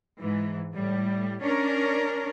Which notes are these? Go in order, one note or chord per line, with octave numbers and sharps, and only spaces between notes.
G#2 E3
A2 G3
C#4 D4 A#4